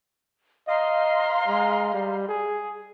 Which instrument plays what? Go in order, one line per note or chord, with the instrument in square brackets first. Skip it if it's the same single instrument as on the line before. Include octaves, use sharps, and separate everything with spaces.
[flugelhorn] D#5 [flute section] F5 A#5 C6
[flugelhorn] G#3
G3
G#4